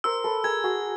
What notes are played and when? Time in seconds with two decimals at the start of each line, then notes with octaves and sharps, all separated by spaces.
0.04 A#4 C5 E6
0.24 A4 B4
0.44 G#4 A#4 G#6
0.64 F#4 G#4